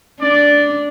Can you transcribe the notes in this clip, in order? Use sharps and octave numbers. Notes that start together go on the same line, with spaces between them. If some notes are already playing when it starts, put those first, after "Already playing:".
D4 D5